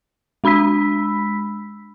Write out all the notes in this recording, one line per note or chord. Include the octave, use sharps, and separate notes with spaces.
G#3 D4 B5 E6 B6